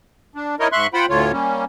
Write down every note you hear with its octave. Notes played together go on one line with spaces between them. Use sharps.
D4
D#4 E4 A#4 C#5 D#5
G#2 E5 C6 C#6 F#6
F4 C5 F#5 G5 B5
D2 A2 D3 F4 C#5
G3 A#3 C#4